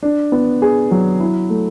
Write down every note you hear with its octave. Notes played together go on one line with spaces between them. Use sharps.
D4
B3
G#4
F#3
E4
A3